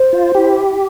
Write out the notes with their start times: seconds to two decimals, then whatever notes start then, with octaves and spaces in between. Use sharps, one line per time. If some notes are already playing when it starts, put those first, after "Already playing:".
Already playing: C5
0.13 F4
0.34 E4 G4